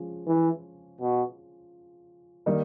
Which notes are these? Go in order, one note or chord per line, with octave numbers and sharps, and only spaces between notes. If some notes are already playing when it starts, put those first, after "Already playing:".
Already playing: F3 G#3 C#4
E3
B2
D#3 G3 A#3 D#4